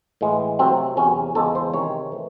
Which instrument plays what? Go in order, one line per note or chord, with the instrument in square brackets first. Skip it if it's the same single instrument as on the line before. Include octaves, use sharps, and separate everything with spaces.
[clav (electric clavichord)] A2 E3 G#3
C3 F#3 A3 C4
E2 C3 F#3 C#4
E2 C#3 G#3 A4
C5
C3 D#3 G#3 C#5
E3 A3